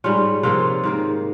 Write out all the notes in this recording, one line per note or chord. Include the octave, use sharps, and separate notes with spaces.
G#2 G3 C#4 F4
C3 F3 A#3 C#4 F4
G#2 D#3 A#3